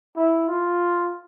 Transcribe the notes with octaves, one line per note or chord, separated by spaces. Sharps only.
E4
F4